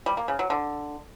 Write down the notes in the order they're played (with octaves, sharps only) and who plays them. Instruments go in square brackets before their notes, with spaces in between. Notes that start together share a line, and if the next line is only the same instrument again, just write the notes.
[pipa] G3
A#3
C#3
F#3
D3